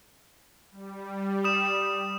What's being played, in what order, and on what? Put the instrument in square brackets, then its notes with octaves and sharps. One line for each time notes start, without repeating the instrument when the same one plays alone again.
[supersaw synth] G3
[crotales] D#6 E7